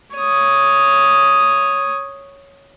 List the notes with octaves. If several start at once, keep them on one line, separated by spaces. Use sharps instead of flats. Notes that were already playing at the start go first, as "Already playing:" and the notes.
C#5 D#6